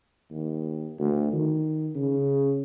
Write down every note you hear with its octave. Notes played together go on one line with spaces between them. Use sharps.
D#2
D2
D#3
C#3